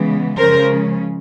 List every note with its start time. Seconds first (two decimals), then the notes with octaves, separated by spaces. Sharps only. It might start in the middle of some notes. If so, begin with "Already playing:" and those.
Already playing: C#3 E3 G#3 B3
0.37 C#3 F3 G#3 C#4 A#4 C5